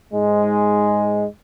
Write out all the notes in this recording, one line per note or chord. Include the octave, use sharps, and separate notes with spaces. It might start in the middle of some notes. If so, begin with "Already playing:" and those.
G#2 G#3